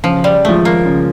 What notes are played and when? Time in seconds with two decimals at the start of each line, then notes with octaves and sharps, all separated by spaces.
0.04 C#3 F3
0.24 G3
0.45 F3 G#3 A3
0.65 A#3
0.85 C#3